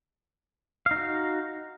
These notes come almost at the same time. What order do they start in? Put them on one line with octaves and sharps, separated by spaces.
F5 D#4 F#4